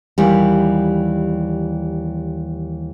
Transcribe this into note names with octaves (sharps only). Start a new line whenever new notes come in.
D#2 E3 G3